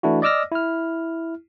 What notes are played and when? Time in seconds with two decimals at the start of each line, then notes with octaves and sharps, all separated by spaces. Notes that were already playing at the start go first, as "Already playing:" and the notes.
0.03 E3 A3 D4 E4 F#4
0.22 D5 D#5 D6 E6 F6 A#6
0.52 E4 F6